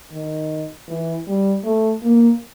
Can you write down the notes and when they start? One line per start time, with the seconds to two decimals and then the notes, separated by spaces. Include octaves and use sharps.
0.11 D#3
0.88 E3
1.27 G3
1.64 A3
2.02 A#3